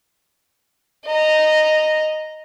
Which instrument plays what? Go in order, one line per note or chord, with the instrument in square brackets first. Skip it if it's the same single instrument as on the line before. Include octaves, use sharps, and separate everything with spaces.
[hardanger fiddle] D#5 A#5